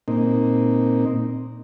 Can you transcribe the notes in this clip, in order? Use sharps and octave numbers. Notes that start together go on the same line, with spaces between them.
A#2 A#3 C4 D#4